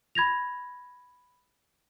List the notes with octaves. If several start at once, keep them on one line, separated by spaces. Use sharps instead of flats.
B5 G#6 A#6 F7